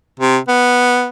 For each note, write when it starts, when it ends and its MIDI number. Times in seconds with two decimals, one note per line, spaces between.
0.19 0.38 48
0.48 1.08 59